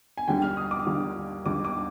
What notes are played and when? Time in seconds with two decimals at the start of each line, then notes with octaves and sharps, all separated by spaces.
0.17 G#5
0.28 D#2 D3 G3 G5
0.42 F6
0.57 D#6
0.71 D6
0.87 D#2 D3 G3
1.46 D#2 D3 G3 D6
1.65 D6